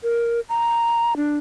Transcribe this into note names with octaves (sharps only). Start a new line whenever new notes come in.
A#4
A#5
D4